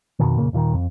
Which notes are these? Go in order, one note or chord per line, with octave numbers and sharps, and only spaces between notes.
F2 B2 D#3
F1 A#2 C#3 A#3
D#1 A#2 D3 D#3
F2